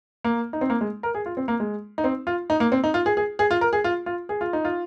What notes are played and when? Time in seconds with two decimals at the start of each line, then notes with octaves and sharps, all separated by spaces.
0.25 A#3
0.53 D#4
0.61 C4
0.70 A#3
0.81 G#3
1.03 A#4
1.14 G#4
1.26 F4
1.37 C4
1.48 A#3
1.60 G#3
1.98 D#4
2.04 C4
2.27 F4
2.50 D#4
2.60 A#3
2.72 C4
2.84 D#4
2.94 F4
3.06 G#4
3.17 G#4
3.39 G#4
3.51 F4
3.61 A#4
3.73 G#4
3.84 F4
4.06 F4
4.29 G#4
4.41 F4
4.53 D#4
4.65 F4